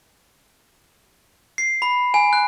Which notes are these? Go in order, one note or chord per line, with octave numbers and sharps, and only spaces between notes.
C7
B5
G#5
F#6